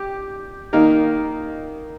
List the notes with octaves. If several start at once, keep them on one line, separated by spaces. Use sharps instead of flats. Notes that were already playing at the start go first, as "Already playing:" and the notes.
Already playing: G4
D#3 A#3 D#4 A#4